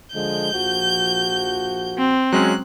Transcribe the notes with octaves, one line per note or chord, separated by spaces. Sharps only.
D3 F3 G#3 G6
A#1 F3 F#4
C4
F#3 G#3 C#4 F#6